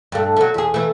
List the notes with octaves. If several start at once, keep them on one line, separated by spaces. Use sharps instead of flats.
G2 A3
F#3 A3
E2 G#4
E3 A3